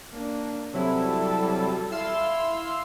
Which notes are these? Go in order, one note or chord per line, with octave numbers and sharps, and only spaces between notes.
A#3 D4
C3 F#3 G3 E4 A4
E4 F5 C6 E6